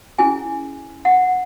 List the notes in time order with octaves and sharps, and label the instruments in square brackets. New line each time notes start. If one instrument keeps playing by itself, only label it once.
[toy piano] C#4 E4 G#4 G#5
F#5